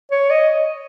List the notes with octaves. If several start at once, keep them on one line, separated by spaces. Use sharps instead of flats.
C#5
D#5